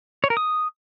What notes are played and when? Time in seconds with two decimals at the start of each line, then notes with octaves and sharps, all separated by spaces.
0.24 C#5
0.30 A#4
0.37 D#6